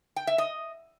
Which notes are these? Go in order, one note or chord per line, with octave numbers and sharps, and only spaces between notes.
G5
E5
D#5